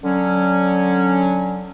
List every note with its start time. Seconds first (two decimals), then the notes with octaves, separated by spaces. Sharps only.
0.04 D3 F#3 C#4